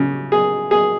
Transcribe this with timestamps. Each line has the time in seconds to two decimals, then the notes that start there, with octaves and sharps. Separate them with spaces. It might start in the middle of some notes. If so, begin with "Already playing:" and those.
Already playing: C#3
0.32 G#4
0.71 G#4